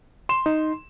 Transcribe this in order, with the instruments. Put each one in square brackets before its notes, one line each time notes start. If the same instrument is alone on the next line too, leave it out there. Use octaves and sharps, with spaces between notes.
[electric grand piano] C6 E7
[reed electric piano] D#4